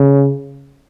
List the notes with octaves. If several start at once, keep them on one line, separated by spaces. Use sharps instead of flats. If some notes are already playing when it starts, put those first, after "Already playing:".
Already playing: C#3